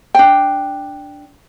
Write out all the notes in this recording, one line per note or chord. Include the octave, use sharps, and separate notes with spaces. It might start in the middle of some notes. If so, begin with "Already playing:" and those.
D4 G5